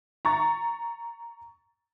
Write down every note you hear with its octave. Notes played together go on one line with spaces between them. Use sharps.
A#5 C#6 A6